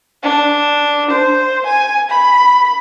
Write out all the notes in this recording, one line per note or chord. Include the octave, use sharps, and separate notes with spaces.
D4
C5
G#5
B5